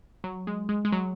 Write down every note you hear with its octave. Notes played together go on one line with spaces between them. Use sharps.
F#3
G#3
G#3
G#3
F#3